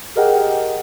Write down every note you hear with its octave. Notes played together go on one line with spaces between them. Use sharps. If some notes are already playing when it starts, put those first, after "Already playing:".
G4 G#4 A#4 D#5 F#5 G5